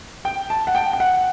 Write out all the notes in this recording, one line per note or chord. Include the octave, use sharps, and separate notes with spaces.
G5
A5
F#5
G5
G5
F#5